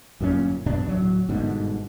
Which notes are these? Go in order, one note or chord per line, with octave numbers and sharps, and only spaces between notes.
G1 F#2 A#2 C#4
F#2 B2 D4
D1 F#3
G1 G#2 B2 D3